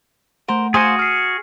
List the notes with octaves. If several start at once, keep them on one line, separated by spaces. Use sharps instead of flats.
A3 A#4 C5 F#5
F#4 G#4 C5 F5 G#5
D6 F6 C7